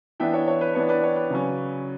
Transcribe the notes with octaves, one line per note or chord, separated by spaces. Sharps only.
E3 B3 D4 E5 G5
C#5 E5
C#5
B4
E3 B3 D4 C#5
B4 D5
C#5
B4 D5
C#3 F#3 C#4